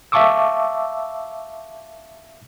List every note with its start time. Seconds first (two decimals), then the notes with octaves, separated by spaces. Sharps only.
0.12 E5 F5 A5 C#6 D6 E6